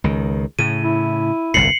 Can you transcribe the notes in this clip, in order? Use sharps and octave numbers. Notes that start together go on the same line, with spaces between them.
C#2 D#3
A2 C#3 D#7
E4
G1 C2 A2 C7 C#7 F#7